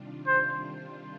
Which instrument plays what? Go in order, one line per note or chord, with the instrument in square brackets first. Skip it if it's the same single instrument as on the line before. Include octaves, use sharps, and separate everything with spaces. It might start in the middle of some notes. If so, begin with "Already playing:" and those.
Already playing: [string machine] C3 D#3 G3 D4 F4
[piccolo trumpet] C5